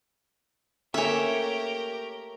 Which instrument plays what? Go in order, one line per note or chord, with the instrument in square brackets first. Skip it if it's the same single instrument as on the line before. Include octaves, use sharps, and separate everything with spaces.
[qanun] A3 A#3 [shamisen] C#4 G#5 [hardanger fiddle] G4 A#4 [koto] C#5 E5